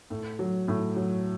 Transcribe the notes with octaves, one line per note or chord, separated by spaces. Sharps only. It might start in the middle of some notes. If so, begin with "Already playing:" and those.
A2
F#3
A2
F#3